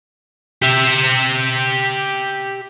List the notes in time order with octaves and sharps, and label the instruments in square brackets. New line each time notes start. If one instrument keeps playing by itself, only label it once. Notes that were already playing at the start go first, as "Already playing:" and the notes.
[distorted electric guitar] G4 E5